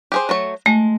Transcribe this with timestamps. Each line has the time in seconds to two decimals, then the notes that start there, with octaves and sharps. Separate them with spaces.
0.12 G4 G#4 C5
0.29 F#3 A3 C#5
0.66 G#3 A3